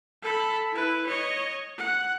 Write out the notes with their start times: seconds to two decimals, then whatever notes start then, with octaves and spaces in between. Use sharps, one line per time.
0.22 A4 B5
0.72 E4 B4
1.07 C#5 D#5
1.78 F#5